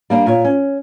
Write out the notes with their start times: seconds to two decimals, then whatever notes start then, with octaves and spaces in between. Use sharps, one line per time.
0.10 G3 A#3 D4
0.26 A#2 C#5
0.45 C#4